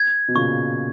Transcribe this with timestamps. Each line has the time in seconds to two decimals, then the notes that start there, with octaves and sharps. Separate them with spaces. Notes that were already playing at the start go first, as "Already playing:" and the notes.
Already playing: G#6
0.28 B2
0.35 A#2 C#3 C#6